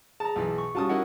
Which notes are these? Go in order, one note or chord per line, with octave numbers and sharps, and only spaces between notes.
G#4 A5 A#5
B1 E3
C#6
G3 C#4 F4 F#4 A5 D#6
D#4 E4 A#4 D#5 F#5